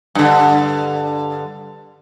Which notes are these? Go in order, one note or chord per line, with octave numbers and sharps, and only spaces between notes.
G2 D3